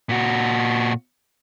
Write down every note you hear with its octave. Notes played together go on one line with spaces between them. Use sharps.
A#2 F#4